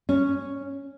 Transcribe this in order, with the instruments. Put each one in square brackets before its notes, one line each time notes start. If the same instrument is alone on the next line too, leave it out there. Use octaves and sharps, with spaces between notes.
[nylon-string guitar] C#4